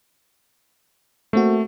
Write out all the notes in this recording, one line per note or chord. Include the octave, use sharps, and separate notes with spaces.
A3 A#3 C4 F#4